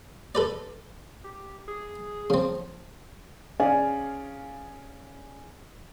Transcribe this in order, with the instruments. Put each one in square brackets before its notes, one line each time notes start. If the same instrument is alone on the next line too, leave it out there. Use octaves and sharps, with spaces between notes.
[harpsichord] A4 B4 D5
[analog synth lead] G4
G#4
[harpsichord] C#3 C4 [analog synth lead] F3
[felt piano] C#4 G#4 D5 F5 G#5